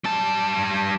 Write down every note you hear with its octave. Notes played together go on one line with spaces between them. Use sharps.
G3 A5